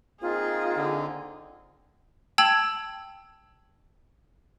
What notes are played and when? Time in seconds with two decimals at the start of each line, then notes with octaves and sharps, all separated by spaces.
0.22 A#3 C4 D#4 F4 G#4
0.77 D3
2.38 G5 A5 E6 G#6 F#7